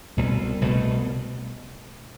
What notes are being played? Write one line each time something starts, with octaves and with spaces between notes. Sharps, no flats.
C2 B2 A3
C2 B2 A3